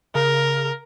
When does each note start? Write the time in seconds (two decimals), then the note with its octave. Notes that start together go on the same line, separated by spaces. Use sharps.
0.15 C#3 A#4